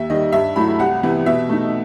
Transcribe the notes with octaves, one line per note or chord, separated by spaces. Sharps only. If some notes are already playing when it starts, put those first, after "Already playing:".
Already playing: D#2 E5
D#3 G3 D#5
G2 E5
F#3 A3 E4 B5
C2 F#5
C3 E3 B3 E4
B2 E5
A3 D#4